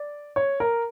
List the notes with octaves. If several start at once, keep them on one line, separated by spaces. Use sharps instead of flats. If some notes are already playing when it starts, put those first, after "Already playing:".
Already playing: D5
C#5
A#4